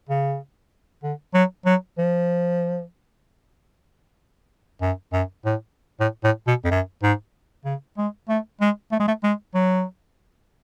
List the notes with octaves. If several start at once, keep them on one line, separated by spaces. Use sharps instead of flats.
C#3
D3
F#3
F#3
F3
F#2
F#2
A2
A2
A2
B2
F2
F#2
G#2
C#3
G#3
A3
G#3
A3
G#3
A3
G#3
F#3